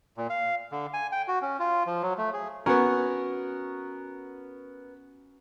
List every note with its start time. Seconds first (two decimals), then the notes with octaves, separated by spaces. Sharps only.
0.17 A#2
0.30 F5
0.72 D3
0.94 G#5
1.12 G5
1.28 F#4
1.42 C#4
1.60 F4
1.86 F3
2.03 F#3
2.18 A3
2.33 G#4
2.66 B3 C#4 F#4 A#4